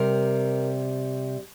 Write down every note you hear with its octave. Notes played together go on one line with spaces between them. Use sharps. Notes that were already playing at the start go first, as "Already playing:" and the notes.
Already playing: C3 G3 A#4